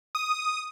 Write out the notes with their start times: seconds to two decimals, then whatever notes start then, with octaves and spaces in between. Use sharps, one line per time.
0.15 D#6